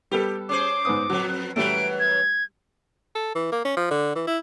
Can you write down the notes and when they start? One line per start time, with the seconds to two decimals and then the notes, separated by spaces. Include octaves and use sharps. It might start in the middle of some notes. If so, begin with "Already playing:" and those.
0.11 G3 B3 G4 A4
0.49 C#4 G#4 C5 D6
0.85 G#2 B3 D#6
1.10 F2 F#3 B3
1.56 F#2 E3 G3 A3 B4 D7
2.00 G#6
3.15 A4
3.35 E3
3.52 A#3
3.65 C#4
3.77 F3
3.91 D3
4.15 E3
4.27 E4